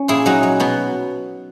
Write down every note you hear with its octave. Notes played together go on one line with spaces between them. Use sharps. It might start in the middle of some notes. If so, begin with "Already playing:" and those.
Already playing: C#4
A#2 E4 G#4
F#3 D#4 F#4
F#3
B2 B3